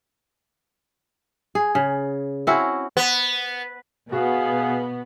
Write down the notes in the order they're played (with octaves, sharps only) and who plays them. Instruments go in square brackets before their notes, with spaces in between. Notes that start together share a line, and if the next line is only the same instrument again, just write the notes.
[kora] G#4
C#3
C4 C#4 E4 F#4
[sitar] B3
[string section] B2 B3 [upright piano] F#4 [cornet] G#4 [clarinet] F5